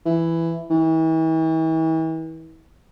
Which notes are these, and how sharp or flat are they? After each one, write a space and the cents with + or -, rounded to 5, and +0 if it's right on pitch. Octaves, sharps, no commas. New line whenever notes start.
E3 +10
E3 -40